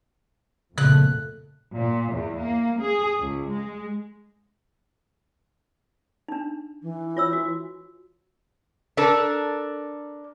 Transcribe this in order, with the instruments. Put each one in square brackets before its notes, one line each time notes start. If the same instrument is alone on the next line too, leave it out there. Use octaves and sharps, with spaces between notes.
[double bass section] F2 A#2 A3 [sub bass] C#3 [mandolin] F#6
[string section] A#2
E2
A#3
G#4
C#2
G#3
[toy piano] D4 D#4
[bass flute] E3
[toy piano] F4 C#5 E6
F#4
[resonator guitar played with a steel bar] D4 A4 A#4